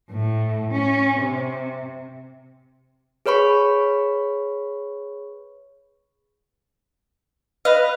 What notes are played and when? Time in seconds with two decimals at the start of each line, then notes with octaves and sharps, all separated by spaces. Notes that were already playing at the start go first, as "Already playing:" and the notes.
0.10 A2
0.72 C#4
1.20 C3
3.26 G#4 B4 C#5 B5 C#6
7.65 B4 D#5 F5